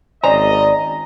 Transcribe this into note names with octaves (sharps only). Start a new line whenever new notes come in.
G#1 C#4 C5 D5 D#5 A#5